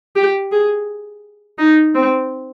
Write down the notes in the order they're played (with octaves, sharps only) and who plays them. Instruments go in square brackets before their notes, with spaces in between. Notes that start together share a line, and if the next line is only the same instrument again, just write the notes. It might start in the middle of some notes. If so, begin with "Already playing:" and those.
[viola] G4
G#4
D#4
C4